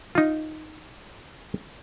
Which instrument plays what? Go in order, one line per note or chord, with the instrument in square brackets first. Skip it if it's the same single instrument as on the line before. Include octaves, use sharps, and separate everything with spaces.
[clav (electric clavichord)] D#4 F4